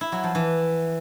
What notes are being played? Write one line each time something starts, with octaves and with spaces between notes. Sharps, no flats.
E4
F#3
F3
E3